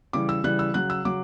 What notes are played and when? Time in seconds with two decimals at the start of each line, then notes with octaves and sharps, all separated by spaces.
0.13 C#3 E3 G3 D6
0.29 E6
0.44 C#3 E3 G3 F#6
0.59 E6
0.74 C#3 F#3 F#6
0.90 E6
1.05 C#3 F#3 D6